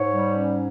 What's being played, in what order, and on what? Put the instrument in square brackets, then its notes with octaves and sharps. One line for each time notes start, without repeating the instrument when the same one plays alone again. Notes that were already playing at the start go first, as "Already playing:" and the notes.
Already playing: [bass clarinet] G#2 [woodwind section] C#5
[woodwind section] G3
C#4